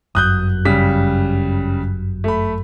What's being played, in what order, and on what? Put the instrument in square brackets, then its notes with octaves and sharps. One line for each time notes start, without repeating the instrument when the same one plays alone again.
[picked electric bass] G1 F#2 [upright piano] D#6 F#6 G6
[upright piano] C#3 G3 B6
A3 B5